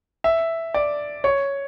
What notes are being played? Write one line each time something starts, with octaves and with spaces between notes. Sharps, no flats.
E5
D5
C#5